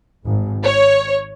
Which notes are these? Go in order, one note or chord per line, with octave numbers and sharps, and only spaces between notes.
G#1
C#5